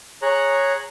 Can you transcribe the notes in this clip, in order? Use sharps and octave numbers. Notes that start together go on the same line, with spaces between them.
G#4 C#5 A#5 F#6